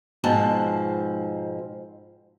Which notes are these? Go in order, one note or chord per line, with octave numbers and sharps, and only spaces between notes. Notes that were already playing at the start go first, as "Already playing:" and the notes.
G#2 B2 F3 C4 A5